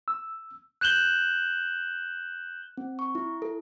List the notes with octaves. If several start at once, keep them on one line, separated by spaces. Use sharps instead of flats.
E6
F#6 G6 E7 F#7 G7
C4
C#6
E4
A4